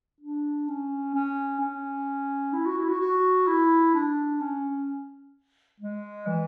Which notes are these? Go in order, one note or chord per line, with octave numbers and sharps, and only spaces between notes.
D4
C#4
C#4
C#4
E4
F#4
E4
F#4
F#4
E4
D4
C#4
G#3
E3